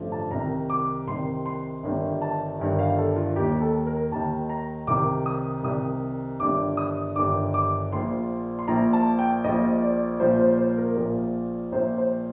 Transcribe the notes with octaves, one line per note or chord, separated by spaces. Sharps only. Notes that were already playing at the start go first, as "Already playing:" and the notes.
Already playing: A1 G2 D3 F3
A5
C2 C3 D#3 A#5
D6
C2 C3 D#3 C6
C6
G1 G2 D#3
A5
G1 G2 D#3
F5
A4
F4
D#2 D#3 G4
A4
A#4
D#2 D#3 A5
A#5
C2 C3 D#3 D6
D#6
C2 C3 D#3 D#6
G1 G2 D#3 D6
D#6
G1 G2 D#3 D6
D6
A#1 A#2 F3 C6
C6
A#1 A#2 F3 A#5
A5
G5
A#1 A#2 F3 D#5
D5
A#1 A#2 F3 C5
C5
C5
A#4
A#1 A#2 F3
A#1 A#2 F3 C5
C5